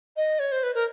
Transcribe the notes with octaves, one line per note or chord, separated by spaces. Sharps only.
D#5
C#5
C5
B4
A#4